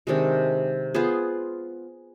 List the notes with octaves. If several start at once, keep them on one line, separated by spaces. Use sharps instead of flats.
C3 D#3 G#3 D4
B3 F4 G#4 C5